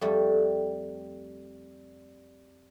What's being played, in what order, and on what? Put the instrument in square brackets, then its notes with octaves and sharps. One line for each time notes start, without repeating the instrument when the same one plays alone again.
[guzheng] F2 G3 A3